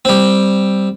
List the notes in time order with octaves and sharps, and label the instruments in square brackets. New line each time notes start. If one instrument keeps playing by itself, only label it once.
[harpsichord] G3 C4